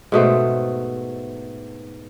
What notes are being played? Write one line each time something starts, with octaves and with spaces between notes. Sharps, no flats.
G#2 B2 A3 C5